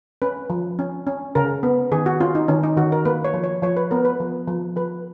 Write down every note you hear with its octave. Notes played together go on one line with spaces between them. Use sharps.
C#4 B4
F3
C#4
C#4
C#3 A#4
B3
D#3 G#4
F#4
C#4 F4
D#4
D#3 C#4
D#4
D#3 F#4
A#4
A#3 B4
C#5
F3
C#5
F3 C#5
B4
B3 A#4
B4
F3
F3
F3 B4